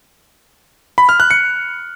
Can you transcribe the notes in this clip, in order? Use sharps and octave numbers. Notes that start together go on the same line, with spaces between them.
B5
F6
F#6
C#7